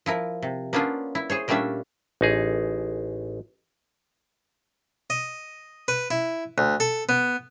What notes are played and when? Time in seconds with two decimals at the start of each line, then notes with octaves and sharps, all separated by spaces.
0.06 F3 E4 A#4
0.42 C3
0.73 A#3 B3 C#4 D4 F4
1.15 E4
1.30 G#4 C5 C#5
1.48 A#2 G3 A3 C#4 D4 E5
2.21 A1 D#4 G#4
5.10 D#5
5.88 B4
6.11 E4
6.58 D2
6.80 A4
7.09 B3